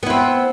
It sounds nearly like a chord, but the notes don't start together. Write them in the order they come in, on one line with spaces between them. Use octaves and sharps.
B3 E4 C4